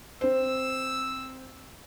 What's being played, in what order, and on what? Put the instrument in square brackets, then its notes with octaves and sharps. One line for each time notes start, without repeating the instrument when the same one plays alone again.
[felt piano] C4 C5 [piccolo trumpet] E6